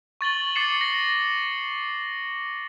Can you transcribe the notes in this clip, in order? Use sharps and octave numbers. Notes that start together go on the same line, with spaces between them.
C#6 A6 F#7 G7
D6 A6 C7 C#7 E7
A#6